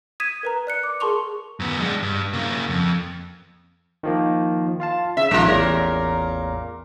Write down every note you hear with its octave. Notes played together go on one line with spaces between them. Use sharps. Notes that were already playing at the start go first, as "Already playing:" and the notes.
D#6 G#6 B6 D#7 E7
A#4 B4 A#5
D5 F#6 C#7
D6
G#4 A#4 A5 C6 C#6 F7
F#2 B3
G#3 D4
G2
C#3 A#3
F2
D#3 F3 A#3
F4 F5 A5
C#3 E5
A#1 D#3 G3 F4 A#5
A1 E2 A#2 A#4 C#5